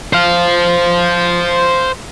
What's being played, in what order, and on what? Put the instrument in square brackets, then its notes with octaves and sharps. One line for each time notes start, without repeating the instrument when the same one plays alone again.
[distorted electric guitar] C5 F5